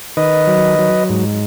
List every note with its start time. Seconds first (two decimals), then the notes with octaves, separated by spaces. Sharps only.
0.17 D#3 B4 D#5
0.47 F#3
0.79 F#3
1.09 G#2